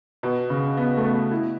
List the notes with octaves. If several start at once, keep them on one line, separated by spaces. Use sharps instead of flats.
B2
C#3
B3
A3
B3
E4